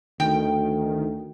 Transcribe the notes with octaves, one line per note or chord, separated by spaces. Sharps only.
D2 D#3 G5